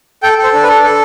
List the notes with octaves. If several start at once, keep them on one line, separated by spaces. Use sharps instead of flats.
A4 G5
A4
C5
D4
B4
A4
A4